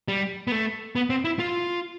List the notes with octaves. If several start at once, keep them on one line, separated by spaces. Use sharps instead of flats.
G3
B3
A3
B3
C4
E4
F4